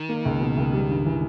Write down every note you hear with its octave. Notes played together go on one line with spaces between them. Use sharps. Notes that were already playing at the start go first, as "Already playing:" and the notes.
Already playing: D#3
A#3
C#2
B2
C#2
G3
G2
E3